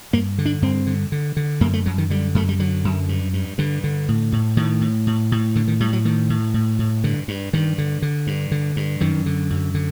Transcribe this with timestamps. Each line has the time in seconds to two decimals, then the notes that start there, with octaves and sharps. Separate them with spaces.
0.13 G2 A#3
0.38 D3
0.46 D4
0.62 G2 C4
0.87 D3
1.12 D3
1.37 D3
1.61 F#2 A#3
1.73 A3
1.86 F#2 F#3
1.98 D#3
2.10 D3 G3
2.35 F#2 A3
2.49 G3
2.59 D3 F#3
2.85 F#2
3.09 G2
3.33 G2
3.58 G2 D3
3.84 D3
4.08 A2
4.32 A2
4.57 A2 D#3
4.81 A2
5.07 A2
5.32 A2
5.55 A2 D3
5.68 D#3
5.80 A2 G3
5.93 F#3
6.05 A2 D#3
6.30 A2
6.54 A2
6.79 A2
7.04 G2 D3
7.28 G2
7.53 G2 D#3
7.78 D3
8.02 D3
8.27 G2
8.52 D3
8.76 G2
9.00 F#2 D#3
9.26 D3
9.50 F#2
9.75 D3